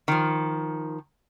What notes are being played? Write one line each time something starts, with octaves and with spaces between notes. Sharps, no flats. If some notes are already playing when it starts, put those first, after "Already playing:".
D#3 F3